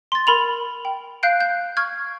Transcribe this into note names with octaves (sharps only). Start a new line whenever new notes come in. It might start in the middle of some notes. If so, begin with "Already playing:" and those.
C6 A6
A#4 B5 F7
G5
F5 F#6 G6 C7 D7
G6
C#6 F6 G#6